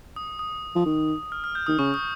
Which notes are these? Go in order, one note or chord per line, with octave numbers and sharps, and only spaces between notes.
D#6
D#6
F3
D#3
F6
F6
G6
D#3 D#6
C#3 C#6
D#6